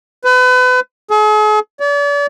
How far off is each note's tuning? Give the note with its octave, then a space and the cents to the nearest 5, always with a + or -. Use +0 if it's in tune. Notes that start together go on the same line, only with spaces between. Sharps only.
B4 +35
G#4 +45
D5 -40